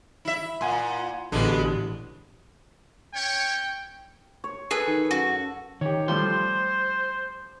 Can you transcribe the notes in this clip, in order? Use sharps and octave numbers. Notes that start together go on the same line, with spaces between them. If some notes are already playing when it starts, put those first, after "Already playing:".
E4 E5
A#2 F#5 G#5 C6
A1 B2 D3 G#3 B3 D4
C#4 C#5 G5
C#5
G#4 A4 B4
D#3
F#2 F#4
D#3 G4 C#5
F3 G3 A3 C5 C6